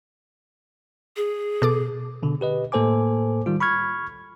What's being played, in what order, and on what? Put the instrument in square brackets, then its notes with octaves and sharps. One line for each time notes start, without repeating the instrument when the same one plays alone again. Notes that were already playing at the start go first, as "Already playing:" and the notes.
[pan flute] G#4
[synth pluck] B2 A4 D6
[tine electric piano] B2 D3
G4 B4 D#5
A2 A#3 A4 C5 G#5 D6
D#3 G3 F4
B5 C#6 F6 G#6